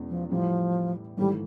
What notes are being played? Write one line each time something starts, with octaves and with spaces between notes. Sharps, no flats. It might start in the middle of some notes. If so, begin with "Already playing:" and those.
Already playing: E2 B2 G#3 C#4
F3
A2 E3 F3 G3
G#1 G#2 E3 G3 A3